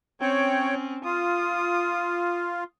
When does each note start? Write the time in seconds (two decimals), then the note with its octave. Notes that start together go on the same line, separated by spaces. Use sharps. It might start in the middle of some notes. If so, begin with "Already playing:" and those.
0.21 C4 C#4 C#5 G5
1.05 F4 D#6